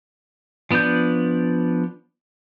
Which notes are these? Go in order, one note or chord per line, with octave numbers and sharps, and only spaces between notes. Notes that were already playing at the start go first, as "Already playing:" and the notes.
F3 B3 D4 D5 G6